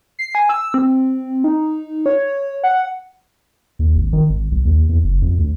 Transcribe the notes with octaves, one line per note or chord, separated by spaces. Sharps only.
C7
G#5
E6
C4
D#4
C#5
F#5
D#2
G#1
D#3
G#1
B1
D#2
E2
F#1
F2
D2